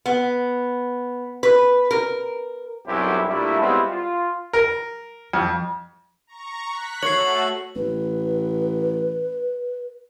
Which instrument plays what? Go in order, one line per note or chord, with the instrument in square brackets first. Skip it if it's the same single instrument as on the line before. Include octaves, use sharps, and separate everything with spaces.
[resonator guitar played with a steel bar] B3
B4
A#4
[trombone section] B1 F#2 G3 C4 E4 G4
A#2 G3 A3 D4 E4
G3 G#3 B3 C4 E4 F4
F4
[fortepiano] A#4
F2
[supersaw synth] A#5 C#6
F#6 B6
[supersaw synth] A3 F#4 A4 [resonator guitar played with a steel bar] C#5 [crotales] C7 F#7
[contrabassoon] A1 [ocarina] B4